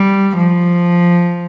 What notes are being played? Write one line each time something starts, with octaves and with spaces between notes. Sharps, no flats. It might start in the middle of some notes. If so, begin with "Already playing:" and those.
Already playing: G3
F3